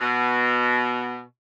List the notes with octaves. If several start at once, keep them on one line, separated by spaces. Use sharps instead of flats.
B2